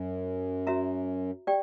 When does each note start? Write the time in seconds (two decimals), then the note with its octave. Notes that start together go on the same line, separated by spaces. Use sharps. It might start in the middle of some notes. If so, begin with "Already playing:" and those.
Already playing: F#2
0.67 F#4 C#5 E5 A#5
1.47 G4 D5 G5